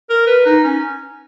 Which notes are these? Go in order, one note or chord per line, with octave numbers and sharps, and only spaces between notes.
A#4
B4
D#4
C#4